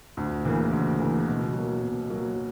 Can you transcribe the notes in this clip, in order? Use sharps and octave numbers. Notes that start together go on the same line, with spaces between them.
D2
C#3 E3 A#3
D2
C#3 E3 A#3
B2
F#3 A#3
B2
F#3 A#3